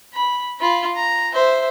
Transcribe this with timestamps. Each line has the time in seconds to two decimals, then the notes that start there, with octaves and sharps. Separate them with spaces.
0.13 B5
0.60 F4 B5
0.96 A#5
1.33 C5 E5